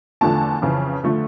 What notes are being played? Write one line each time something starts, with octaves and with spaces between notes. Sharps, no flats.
E2 D3 F3 A3 A5
F2 C#3 E3
D3 F3 A3